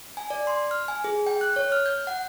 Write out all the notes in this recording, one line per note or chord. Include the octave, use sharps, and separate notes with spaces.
G#5
D5
C6
F6
G#5
G#4
G5
F#6
C#5
F6
G6
F#5